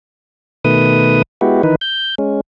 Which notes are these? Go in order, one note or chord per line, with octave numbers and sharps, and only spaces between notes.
B2 D#3 A3 B4 D#6
G#3 B3 E4 F#4 G4
D#3 E3 D#4 B4
G6
G#3 C#4